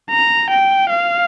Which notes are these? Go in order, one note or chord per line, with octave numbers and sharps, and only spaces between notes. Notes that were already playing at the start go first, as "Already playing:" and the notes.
A#5
G5
F5